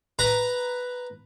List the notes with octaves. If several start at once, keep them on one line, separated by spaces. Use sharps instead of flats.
B4 A#5